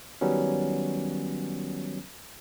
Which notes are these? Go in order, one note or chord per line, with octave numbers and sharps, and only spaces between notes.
D#3 F#3 G3 B3 C#4